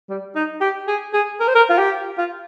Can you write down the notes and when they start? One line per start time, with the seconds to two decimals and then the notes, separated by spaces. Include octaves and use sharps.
0.09 G3
0.36 D#4
0.61 G4
0.88 G#4
1.14 G#4
1.40 A#4
1.48 C5
1.55 A#4
1.70 F4
1.78 G4
2.18 F4